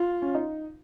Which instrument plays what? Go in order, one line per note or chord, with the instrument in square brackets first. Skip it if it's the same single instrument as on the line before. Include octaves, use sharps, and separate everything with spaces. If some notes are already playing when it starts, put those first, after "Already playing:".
Already playing: [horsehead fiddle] F4
[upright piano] C#4
D#4